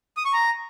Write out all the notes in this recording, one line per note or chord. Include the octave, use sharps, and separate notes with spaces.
D#6
C#6
A#5